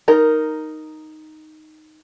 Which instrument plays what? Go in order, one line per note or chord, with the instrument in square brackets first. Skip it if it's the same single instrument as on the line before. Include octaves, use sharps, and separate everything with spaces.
[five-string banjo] D#4 A#4